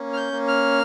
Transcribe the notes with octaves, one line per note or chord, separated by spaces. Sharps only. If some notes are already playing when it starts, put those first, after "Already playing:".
Already playing: A#3 C#4
F6
G6
A#3
F6